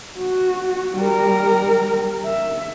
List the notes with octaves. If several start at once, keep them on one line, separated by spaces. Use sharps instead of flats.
F#4
G3 A#4
E5